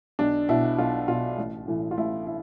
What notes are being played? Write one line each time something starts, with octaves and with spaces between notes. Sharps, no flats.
B1 D4
B2 E4
B1 F4
B2 F4
A1
A2 E3
F4
A1 E4
E4